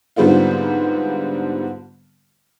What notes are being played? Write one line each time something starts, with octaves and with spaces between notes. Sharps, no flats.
G#2 D3 G3 B3 C4 F4